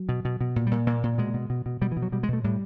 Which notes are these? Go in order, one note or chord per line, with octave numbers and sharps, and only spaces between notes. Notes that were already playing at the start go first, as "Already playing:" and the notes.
Already playing: F#3
B2
B2
B2
A#2
G3
A#2
A#2 A#3
A#2
B2 G#3
B2
B2
B2
B2 G3
E3
B2
F#3
B2 G3
G#3
B2 A3
A2 G3